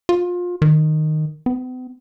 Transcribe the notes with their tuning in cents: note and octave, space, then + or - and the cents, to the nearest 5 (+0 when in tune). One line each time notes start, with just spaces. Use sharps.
F4 +25
D#3 -10
B3 +45